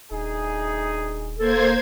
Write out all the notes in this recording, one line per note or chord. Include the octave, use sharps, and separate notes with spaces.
D#1 D2 D#4 G#4
A#3 A4 C5 G#6